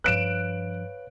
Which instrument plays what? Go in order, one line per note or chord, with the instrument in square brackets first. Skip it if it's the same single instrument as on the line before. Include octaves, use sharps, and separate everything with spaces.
[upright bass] G2 F3 [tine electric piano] B4 C#5 F5 [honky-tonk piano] F#6 D7 E7